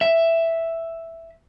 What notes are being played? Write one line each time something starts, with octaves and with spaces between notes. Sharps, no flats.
E5